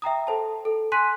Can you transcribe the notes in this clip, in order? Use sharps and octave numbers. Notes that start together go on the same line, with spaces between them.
E5 G5 A#5 D#6
A4 C5 A5
A4
G#5 C6 F#6 B6 D#7